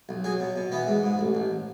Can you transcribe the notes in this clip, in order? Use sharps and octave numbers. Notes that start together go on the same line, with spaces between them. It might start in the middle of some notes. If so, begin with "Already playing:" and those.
B1
F#3 G#4
B2
B2
E3 B3
G#2
G#2
A1
A1